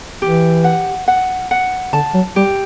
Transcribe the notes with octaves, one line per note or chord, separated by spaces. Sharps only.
E3 G4
F#5
F#5
F#5
D3 A5
F#3
G3 G4